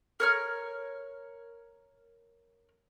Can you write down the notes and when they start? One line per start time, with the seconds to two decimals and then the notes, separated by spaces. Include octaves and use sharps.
0.20 A#4 C#5 F6